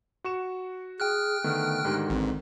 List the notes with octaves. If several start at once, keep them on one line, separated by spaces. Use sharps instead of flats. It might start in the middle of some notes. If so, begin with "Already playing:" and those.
F#4 C#6 E7
G#4 G5 F6 F#6
D3 D#3 A3 B3
G#2 D3 D#3 G4
A1 C4